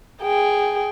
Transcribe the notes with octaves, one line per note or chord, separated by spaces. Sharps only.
G#4 G5